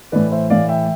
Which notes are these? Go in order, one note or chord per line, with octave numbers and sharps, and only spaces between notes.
A2 E3 B4 D5
C5 E5
A2 E3 D5 F5
E5 G5